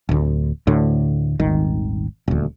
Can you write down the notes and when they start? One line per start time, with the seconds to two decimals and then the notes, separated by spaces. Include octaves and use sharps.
0.09 D1 D2
0.67 D2 A2 D3
1.40 D#1 G#1 D#3
2.28 D#1 D2